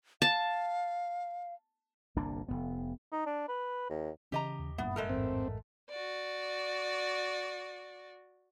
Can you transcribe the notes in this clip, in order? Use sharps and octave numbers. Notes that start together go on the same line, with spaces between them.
F5 A5
G1 C2 A#3 D4
F1 F#2 B3
D#4
D4
B4
D#2
C#3 E3 C#4 G4 D#5 A#5
D#2
F#1 G2 A#2 B3 E5 B5 D#6
G#3 A3 A#4
A1 F2 G#2 C4
F#4 D5